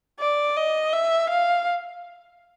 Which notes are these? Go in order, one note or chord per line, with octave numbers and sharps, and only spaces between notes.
D5
D#5
E5
F5